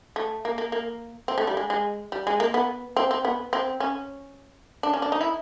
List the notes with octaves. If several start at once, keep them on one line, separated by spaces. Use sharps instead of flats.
A3
A#3
A#3
A#3
C4
A3
G3
G#3
G#3
G3
G#3
A#3
B3
C4
C4
B3
C4
C#4
D4
C#4
D4
D#4
E4